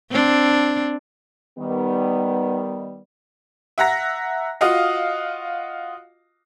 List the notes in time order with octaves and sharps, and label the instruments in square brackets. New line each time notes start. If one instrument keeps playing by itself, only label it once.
[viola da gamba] C4 D4
[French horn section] D#3 G3 B3
[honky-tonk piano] E5 F#5 A#5 A#6
F4 F#4 D#5 F5